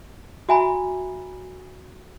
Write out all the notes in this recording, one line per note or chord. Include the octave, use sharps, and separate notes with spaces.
F#4 E5 G#5 A#5 B5